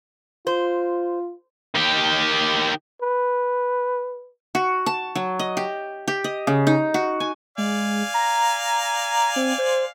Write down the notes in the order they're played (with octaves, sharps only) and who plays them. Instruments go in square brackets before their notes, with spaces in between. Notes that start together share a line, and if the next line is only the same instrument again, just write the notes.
[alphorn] F4 [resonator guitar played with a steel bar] C5
[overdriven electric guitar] D#3 G4
[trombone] B4
[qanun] F#4
A5
F#3
D#5
G4
G4
D#5
C#3
D#4
F#4
G#5
[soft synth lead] G#3 [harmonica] D5 F5 G#5
[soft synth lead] A#5
C4
C5